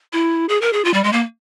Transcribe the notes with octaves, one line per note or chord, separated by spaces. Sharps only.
E4
G#4
A#4
G#4
F4
G3
G#3
A#3